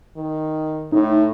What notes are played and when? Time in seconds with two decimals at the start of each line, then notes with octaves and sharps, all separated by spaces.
0.17 D#3
0.92 A2 D#4